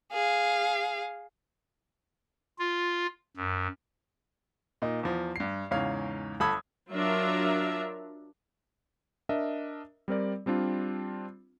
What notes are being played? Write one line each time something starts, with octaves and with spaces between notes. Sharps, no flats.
G#4 F5
F4
F#2
A#2 D#4
E2 F3
G2 C7
E2 G#2 C#3 C#5 F5
G1 A4 B5 D#6 E6 G#6
F#3 D4 F4 A#4 E5 A#5
D4 A#4 D#5 E5
G3 C4 A#4 D5
G3 C4 D4 F4